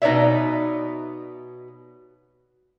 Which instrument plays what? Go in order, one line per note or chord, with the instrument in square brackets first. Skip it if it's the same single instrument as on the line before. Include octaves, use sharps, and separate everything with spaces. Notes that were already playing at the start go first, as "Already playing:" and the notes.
[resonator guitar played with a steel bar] B2 D#4 B4 C#5 D5 E5